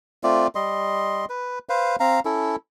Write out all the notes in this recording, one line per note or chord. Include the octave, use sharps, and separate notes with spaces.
A3 C4 F4 D5
G3 D#5 C6
B4
B4 C5 F5
C4 F5 A#5
C#4 E4 A4